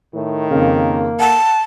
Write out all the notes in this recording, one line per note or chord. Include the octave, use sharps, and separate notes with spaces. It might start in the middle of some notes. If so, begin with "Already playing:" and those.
A2 D#3
F2 C#3 A#3
F#5 A5